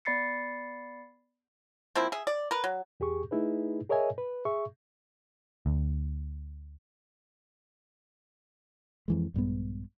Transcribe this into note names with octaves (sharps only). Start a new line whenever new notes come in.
B3 D5 B5 A6 C7 C#7
F3 A#3 C4 E4
G#4 E5
D5
A#4 B4
F#3
E2 G4 G#4 C#6
A3 D#4 E4 G#4 B4
G#4 A#4 C#5 D#5 E5 G#5
B4
G#4 E5 C#6
D2
F2 E3 G#3
A#1 G2 G#3 B3